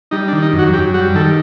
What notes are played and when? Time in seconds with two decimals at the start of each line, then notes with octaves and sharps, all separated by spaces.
0.11 G3 D#4
0.28 D4
0.33 D#3
0.42 D#4
0.53 F#2
0.59 F#4
0.73 F#2 G4
0.94 G3 F#4
1.14 D#3 A4